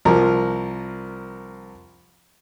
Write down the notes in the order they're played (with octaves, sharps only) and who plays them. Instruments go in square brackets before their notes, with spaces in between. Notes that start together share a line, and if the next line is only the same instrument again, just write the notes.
[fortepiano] C2 F3 A#4